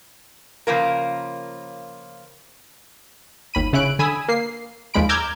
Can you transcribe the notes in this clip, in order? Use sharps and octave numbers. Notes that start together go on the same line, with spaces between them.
C#3 F3 A#3 A#4
G1 D#2 B5 D#7
C#3 C#4 E4 F#6 D7
D3 G#5 B5 D#6 E6
A#3 C7
D#2 F3 G#3 B5 D7
A#5 D6 E6 F6 G6 G#6